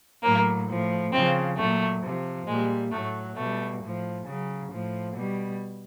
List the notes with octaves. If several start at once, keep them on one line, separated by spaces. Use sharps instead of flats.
A2 F#3 A#3
A2 F3
C#3 F3 C4
A#2 F#3 A3
C3 F3
A#2 G3 G#3
A2 F#3 A3
B2 G3 A3
A2 F3
C#3 F#3
A2 F3
B2 G3